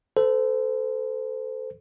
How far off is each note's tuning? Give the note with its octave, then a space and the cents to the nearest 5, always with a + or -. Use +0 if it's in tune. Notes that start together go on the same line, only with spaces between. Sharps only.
A4 +0 C5 -30